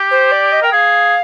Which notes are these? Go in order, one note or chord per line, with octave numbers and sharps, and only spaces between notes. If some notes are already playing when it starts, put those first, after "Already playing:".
Already playing: G4
C5
D5
D#5
A#4 G5
G#4 F5